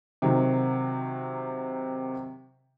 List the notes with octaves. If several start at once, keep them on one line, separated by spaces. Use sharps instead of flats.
C3 D#3 F#3